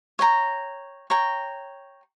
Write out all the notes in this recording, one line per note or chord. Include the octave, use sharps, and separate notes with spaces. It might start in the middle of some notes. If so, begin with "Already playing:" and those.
C#5 G5 A#5
C#5 G5 A#5